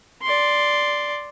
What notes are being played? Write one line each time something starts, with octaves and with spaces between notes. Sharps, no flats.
D5 C6